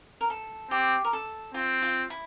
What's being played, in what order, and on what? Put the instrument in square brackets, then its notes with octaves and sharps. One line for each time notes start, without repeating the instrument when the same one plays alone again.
[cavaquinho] A#4
A4
[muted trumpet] C4 [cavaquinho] G4
[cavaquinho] A#4
A4
[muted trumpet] C4 [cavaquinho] F4
[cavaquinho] F4
E4